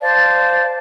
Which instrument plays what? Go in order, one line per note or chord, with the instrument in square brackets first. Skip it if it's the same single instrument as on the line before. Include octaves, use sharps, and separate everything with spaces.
[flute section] C5 D5 F5 A5